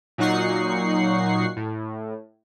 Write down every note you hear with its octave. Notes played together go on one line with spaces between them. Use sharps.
A#2 F#3 D#4 F#5 C#6 C7
A2